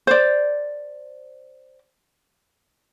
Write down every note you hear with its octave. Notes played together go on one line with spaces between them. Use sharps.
C5 D5